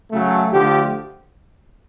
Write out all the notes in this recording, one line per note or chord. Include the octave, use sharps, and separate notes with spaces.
C#3 F#3 A3
D3 F3 A3 G4